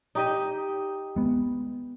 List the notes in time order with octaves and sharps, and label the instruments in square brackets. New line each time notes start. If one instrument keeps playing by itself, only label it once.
[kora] D#4 G4 D#5
[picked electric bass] G#3 B3